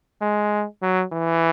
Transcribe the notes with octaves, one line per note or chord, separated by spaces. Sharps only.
G#3
F#3
E3